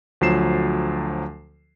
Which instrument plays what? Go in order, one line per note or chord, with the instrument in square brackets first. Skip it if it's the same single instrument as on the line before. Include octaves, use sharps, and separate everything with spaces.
[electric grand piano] D2 F3 F#3 C7 E7